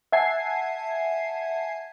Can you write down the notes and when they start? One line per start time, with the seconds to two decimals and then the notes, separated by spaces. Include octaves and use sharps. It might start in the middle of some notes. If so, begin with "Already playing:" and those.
0.12 E5 F#5 G#5 A5 G#6 C7